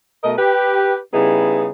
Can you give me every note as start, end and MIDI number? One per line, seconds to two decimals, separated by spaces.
0.24 0.34 47
0.24 0.34 57
0.24 0.34 70
0.24 0.34 75
0.38 0.97 67
0.38 0.97 71
1.14 1.69 49
1.14 1.69 55
1.14 1.69 59
1.14 1.69 63
1.14 1.69 64
1.14 1.69 68